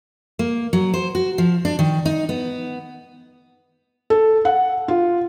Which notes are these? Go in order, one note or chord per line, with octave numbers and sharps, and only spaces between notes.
A#3
F#3
C5
F#4
F3
D4
D#3
D#4
B3
A4
F#5
F4